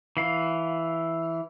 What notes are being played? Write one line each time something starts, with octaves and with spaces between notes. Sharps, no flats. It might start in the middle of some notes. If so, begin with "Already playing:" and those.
E3 F5